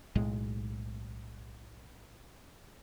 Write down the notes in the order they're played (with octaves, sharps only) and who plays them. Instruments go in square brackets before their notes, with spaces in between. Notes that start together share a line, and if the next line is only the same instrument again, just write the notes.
[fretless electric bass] B1 A2 G#3